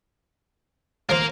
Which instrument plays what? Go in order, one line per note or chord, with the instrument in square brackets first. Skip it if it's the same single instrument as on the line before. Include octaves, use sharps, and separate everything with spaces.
[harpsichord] F3 C5 [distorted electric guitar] A#4 F5